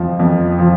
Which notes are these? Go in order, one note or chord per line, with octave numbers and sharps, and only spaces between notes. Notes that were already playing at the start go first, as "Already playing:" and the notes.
Already playing: F2 F3
F2
F3